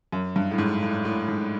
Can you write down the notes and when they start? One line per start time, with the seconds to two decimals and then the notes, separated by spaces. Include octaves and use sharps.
0.12 F#2
0.36 G2
0.52 A2
0.58 G#2
0.83 A2
1.05 A2
1.28 G#2